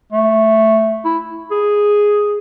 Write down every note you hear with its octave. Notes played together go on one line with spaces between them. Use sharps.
A3
E4
G#4